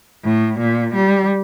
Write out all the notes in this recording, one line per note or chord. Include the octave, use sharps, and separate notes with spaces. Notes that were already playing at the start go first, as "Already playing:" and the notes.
A2
A#2
G3